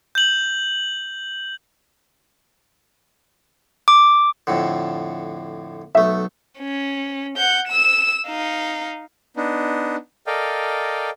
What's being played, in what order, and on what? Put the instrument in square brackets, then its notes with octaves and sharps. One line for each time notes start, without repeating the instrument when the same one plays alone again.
[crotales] G6 F#7
[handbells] D6
[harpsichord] F2 A2 D3
[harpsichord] B1 A3 [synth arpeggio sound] E5
[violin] C#4
F#5 G6
E6 E7
D#4 F5
[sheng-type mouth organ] B3 D4 D#4
A4 A#4 D5 D#5 F5 G5